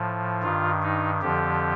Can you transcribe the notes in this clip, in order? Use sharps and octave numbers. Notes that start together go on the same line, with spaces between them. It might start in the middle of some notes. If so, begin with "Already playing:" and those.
Already playing: A2 F3
G2 D#3 F4
D#4
F2 D3 F3 G4